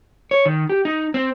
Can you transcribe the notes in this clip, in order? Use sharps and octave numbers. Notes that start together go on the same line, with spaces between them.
C#5
D#3
G4
D#4
C4